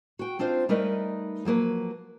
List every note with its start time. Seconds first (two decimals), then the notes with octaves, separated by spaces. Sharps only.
0.19 F#4 G5
0.39 C4 D4 D#4 F4 C5
0.69 G3 A3 D#4 A#4 B4 D#5
1.45 F3 F#3 A#3 B4